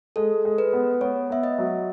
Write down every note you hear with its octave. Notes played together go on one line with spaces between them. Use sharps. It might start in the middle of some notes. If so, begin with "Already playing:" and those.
G#3 A4
G#3
B4
B3
B3 C#5
B3 E5
D#5
F#3